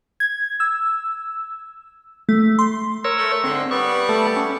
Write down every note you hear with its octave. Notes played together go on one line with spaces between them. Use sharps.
G#6
E6
A3
C6
A#4 C#5 E6
A3
G#2 D3 C4
G3 B3 C#6
A3 A4
C#4